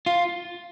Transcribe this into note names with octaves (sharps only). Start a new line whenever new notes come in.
F4